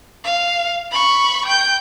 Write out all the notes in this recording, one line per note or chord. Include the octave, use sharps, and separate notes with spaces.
F5
B5 C#6
G5 G6